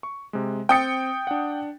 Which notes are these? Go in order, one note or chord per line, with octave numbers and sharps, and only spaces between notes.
C#6
C3 G#3
C4 G5 D#6 A6 C#7
D4 F#5